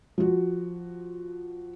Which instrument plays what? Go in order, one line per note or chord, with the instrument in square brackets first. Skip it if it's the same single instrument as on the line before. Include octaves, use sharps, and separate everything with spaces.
[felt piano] F3 F#4